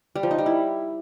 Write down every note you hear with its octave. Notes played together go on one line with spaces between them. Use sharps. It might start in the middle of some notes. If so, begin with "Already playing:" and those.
G3
F3
D#4
G3
E4